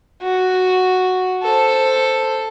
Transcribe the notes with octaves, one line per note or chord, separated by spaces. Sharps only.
F#4
A4 C5